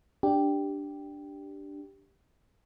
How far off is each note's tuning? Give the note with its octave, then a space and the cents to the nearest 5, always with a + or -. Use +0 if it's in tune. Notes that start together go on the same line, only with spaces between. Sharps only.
D4 +0 G4 +0